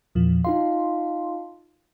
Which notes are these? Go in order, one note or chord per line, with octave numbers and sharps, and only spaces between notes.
E2 A#2 F3
D#4 F4 F5 C6